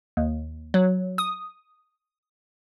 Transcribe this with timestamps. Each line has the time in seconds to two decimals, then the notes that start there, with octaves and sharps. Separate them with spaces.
0.17 D#2
0.74 F#3
1.18 D#6